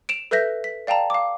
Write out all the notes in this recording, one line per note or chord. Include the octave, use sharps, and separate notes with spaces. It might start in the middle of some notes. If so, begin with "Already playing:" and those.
D7 E7 F7
A4 B4 E5 G6 A#6 B6
B6
D5 F5 G5 A5 A#5
F5 D6